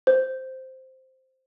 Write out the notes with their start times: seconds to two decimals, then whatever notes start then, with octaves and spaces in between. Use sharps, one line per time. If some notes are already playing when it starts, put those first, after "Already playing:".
0.07 C5